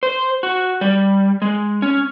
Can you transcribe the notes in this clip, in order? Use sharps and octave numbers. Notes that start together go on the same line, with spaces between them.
C5
F#4
G3
G#3
C#4